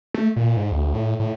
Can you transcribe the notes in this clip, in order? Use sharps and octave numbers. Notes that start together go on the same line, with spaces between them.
A3
A#2
G#2
D2
A2
A2